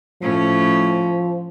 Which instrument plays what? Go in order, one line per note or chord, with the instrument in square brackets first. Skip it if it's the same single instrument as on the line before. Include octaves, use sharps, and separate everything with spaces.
[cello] A2 C#4 [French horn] F3